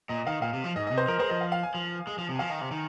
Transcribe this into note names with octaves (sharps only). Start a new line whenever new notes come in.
A#2 D#5
D#3 F5
A#2 F5
C3
F3
G#2 D#5
D#5
C3
C5
F3 A#4
G#3 C5
F3 D#5
F5
F5
G#5
F3
G#3
F3
C3
G#5
F3 F5
D#3
C3
D#3